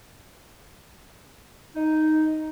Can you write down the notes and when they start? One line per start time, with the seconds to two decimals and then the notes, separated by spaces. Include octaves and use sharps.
1.76 D#4